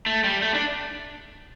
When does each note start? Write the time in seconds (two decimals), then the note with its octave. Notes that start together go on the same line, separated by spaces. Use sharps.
0.06 A3
0.24 G3
0.42 A3
0.54 D4